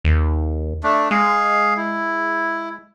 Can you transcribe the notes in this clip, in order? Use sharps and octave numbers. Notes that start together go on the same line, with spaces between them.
D#2
A3 D4
G#3 G#4 F5
E4